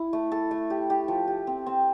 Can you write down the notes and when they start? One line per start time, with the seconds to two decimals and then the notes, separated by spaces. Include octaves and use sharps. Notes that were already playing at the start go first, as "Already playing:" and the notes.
Already playing: E4
0.13 A3
0.32 A4
0.51 A3
0.70 G4
0.90 G4
1.08 F3
1.28 G4
1.47 C4
1.66 C4